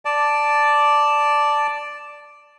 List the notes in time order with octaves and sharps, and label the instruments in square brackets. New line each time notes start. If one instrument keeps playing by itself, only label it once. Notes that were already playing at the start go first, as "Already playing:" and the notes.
[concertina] D5 A5